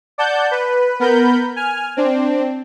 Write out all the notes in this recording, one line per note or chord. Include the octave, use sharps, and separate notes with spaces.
D5 F#5 A5 G6
B4
B3 A#4 B5 G6
G#5 F6
C4 D4